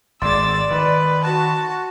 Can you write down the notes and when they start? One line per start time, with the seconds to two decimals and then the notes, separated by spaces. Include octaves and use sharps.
0.22 G#1 G#3 D5 C6 D6 E6 A6
0.71 D#3 B4
1.24 F#4 A5